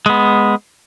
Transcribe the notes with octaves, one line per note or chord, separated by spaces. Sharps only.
G#3 B3